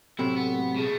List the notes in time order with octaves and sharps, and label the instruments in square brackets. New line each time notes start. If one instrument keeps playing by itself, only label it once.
[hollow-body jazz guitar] A2 C3 F#3 [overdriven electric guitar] E4 [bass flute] A4
[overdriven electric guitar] B3
[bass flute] A3
[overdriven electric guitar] B2 A3 [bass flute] G#4